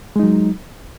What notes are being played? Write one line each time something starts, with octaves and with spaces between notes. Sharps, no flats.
F#3 G#3 D#4